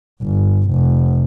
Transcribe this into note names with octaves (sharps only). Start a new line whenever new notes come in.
G1
F1